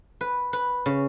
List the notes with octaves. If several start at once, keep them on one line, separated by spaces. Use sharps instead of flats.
B4
B4
C#3